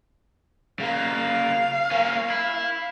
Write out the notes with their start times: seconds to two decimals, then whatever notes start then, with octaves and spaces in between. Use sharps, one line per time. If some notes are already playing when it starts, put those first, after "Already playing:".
0.80 C#3 A#3 F5
1.91 A#3 C#4
2.30 E4